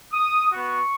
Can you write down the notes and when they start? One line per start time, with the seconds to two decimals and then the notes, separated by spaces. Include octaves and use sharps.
0.12 D#6
0.52 B3 F#4 C#6